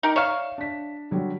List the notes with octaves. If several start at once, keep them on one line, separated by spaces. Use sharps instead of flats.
D#4 G4 A#4
C#5 D5 E5 F5 E7
D4 B6
D3 F#3 G3